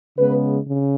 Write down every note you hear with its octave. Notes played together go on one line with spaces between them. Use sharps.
C#3 G#3 B3 B4
C#3